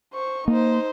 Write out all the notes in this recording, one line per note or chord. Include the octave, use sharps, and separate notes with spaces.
C5 C#6
A#3 D#4 C5